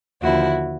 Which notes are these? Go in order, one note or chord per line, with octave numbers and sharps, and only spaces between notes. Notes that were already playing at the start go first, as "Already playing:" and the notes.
D#2 D3 F3 E4 F#4